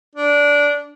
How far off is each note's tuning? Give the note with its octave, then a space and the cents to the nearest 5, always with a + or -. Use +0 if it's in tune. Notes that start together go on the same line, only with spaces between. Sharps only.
D4 -15